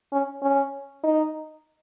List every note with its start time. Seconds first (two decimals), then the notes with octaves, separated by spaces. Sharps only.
0.12 C#4
0.43 C#4
1.04 D#4